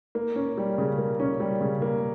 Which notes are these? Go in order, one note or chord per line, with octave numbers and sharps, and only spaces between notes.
A#3
C#4
G3
C#3
A#3
C#4
G3
C#3
A#3